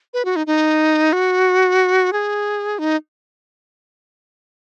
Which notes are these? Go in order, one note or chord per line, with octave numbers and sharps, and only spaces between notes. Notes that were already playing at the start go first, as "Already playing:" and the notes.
B4
F#4
D#4
D#4
F#4
G#4
D#4